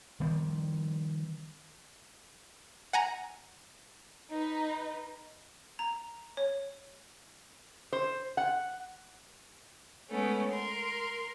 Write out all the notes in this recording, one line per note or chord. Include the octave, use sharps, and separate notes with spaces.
D#3 F3 G3 C4
F#5 G#5 A#5
D#4 B4
A#5
C#5
C5
F#5
G#3 A3 B3 C#4
A#4 C6